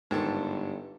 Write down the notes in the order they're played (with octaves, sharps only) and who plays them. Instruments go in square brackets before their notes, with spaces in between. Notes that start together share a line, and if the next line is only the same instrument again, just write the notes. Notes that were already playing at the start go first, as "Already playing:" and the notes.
[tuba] G1 [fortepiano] G#2 D#3 A4